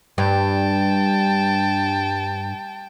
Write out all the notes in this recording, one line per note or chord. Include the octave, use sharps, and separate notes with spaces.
G2 G5 A5